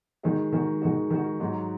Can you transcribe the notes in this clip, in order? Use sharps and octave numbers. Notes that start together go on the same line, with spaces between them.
D#3 G#3 D#4 F#4
D#3 G#3 D#4 F#4
D#3 G#3 D#4 F#4
D#3 G#3 D#4 F#4
G#2 F#3 D#4 F#4